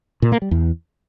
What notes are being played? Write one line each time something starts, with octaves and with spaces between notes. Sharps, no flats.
A#2
A#3
G3
E2